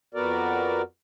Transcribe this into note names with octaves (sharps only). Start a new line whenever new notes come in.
F2 B3 F#4 A#4 D5